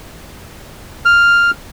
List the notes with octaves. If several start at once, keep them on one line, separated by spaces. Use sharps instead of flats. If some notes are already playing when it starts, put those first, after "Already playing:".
F6